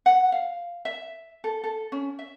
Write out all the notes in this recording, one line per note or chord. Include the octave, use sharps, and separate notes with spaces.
F#5
F5
E5
A4
A4
C#4
E5